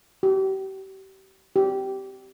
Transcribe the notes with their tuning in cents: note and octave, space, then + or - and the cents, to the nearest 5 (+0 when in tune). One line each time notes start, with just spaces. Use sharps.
G4 -35
G4 -15